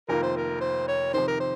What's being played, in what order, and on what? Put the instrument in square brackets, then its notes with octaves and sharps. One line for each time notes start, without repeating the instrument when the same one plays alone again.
[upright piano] F1 F2 D#3 A#3 F4 [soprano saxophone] A#4
[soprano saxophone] C5
A#4
C5
C#5
[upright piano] F2 C3 D#3 [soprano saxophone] C5
[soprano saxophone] A#4
C5